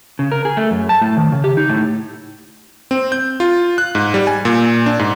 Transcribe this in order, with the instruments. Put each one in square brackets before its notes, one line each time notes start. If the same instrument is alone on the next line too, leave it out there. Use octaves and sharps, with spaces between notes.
[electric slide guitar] C#3
A#4
G#4
A3
F#2
A5
A2
D#3
C#3
G4
D#4
A2
[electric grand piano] C4
G6
F4
F#6
G#2
G3
G#5
A#2
D4
G#2